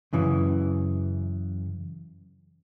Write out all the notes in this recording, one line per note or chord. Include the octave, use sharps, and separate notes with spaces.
F#2 C#3 E3